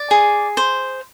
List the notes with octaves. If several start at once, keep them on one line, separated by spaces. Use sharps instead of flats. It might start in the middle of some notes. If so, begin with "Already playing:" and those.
Already playing: D5
G#4
C5